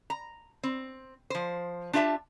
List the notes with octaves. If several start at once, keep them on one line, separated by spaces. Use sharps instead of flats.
A#5
C4
F3 C5
D4 F4 G4 E5 A5